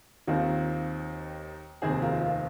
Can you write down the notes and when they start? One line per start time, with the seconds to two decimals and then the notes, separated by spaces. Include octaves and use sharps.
0.27 D#2 D#3 C4 F4
1.82 F1 D#2 D#3 C4 G#4
2.02 F4 A#4
2.21 F4